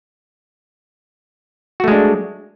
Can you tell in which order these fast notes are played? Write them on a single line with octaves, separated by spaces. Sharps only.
F#4 A3 G#3 D4